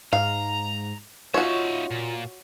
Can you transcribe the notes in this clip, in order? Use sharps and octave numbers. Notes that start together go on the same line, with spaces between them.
G#2 F5 A#5
D#4 F4 F#4 C#5 E5
A#2